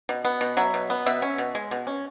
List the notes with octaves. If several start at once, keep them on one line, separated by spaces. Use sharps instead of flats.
B2
B3
B2
F#3 E5
B2
B3
B2 E5
C#4
B2
G#3
B2
C#4